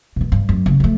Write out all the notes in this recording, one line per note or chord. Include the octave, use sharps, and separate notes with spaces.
B2 D#3
G2
F#2
F#1 C#3
F3 A3